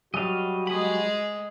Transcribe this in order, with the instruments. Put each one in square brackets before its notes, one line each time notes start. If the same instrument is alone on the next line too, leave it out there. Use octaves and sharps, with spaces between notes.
[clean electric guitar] F#3 G3 [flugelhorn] F#4 [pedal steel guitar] D#5 F5
[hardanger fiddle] G#3 G#4 [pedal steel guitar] B5 D#6